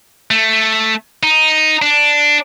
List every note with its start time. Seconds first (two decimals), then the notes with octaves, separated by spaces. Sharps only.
0.31 A3
1.23 D#4
1.82 D4